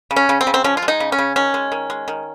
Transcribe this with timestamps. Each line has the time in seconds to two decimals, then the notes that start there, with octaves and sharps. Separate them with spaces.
0.11 C#3
0.16 C#4
0.29 C#3
0.41 C4
0.47 C#3
0.54 C4
0.64 F3 C#4
0.77 F4
0.82 G#3
0.88 D#4
1.00 C#3
1.12 C#4
1.18 C#3
1.36 D#3 C#4
1.54 G#3
1.72 D#3
1.90 G#3
2.08 D#3